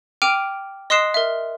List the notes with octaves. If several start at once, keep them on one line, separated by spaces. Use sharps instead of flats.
G5 D6 F6 D7 D#7 F7
D#5 C6 D#6 F#6 C7 E7
A#4 E5